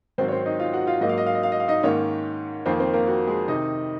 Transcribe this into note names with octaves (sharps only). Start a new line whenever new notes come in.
G#2 D#3 F#3 C4 C5
C#5
C4 C5
D#4 D#5
F4 F5
F#4 F#5
F4 F5
G#2 F#3 A#3 D#5
F5
D#5
F5
D#5
F5
D#5
F5
D#4 D#5
G#2 D#3 A#3 C#4 C#5
F2 D#3 A#3 C4 C5
C4 C5
A#3 A#4
F#4
G#3 G#4
C3 D#3 D#4 D#5